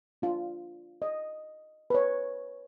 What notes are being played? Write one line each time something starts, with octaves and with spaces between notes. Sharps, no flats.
D4 F4
D#5
B4 C#5